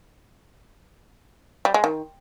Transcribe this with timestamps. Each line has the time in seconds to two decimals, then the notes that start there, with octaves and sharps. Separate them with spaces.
1.65 G3
1.74 G#3
1.84 D#3